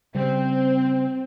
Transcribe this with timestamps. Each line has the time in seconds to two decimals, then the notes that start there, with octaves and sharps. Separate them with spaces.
0.15 C#3 G3 C4